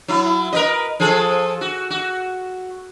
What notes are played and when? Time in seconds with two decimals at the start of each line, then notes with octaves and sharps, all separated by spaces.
0.08 F#3 E4
0.53 A#4 B4 D#5
1.00 F3 G#4 A4
1.61 F#4
1.90 F#4